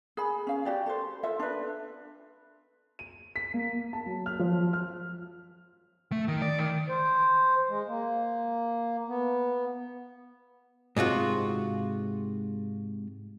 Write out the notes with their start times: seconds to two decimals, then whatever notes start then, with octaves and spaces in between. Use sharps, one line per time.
0.17 G#4 B5
0.47 C#4 F5
0.65 F#4 G4 D5
0.86 A4 C5
1.23 F4 A4 E5
1.40 D4 B4
2.99 D#7
3.36 B6
3.54 A#3
3.93 A5
4.06 F#3
4.26 F6
4.39 F3
4.73 F6
6.12 A3
6.28 D#3
6.42 D5
6.59 D#3
6.88 C5
7.69 G#3
7.87 A#3
9.08 B3
10.96 G#2 C3 F4 F#4